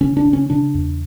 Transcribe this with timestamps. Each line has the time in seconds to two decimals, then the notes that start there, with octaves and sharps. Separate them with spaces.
0.01 C#3 C#4
0.17 D4
0.25 C#3
0.33 C#4
0.50 C#3 D4
0.75 E2